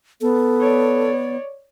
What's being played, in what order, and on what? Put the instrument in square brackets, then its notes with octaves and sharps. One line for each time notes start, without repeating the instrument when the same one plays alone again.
[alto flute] B3 [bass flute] A4
[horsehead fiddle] C#5 D5